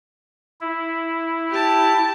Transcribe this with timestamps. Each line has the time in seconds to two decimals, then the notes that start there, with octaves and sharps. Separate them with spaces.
0.61 E4
1.50 G4 A5